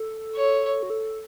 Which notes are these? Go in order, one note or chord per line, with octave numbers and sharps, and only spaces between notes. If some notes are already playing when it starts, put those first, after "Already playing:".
Already playing: A4
C#5
F#4
A4